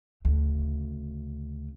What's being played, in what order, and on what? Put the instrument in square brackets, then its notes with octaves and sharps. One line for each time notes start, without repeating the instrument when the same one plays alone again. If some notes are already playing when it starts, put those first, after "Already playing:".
[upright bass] D2 C#3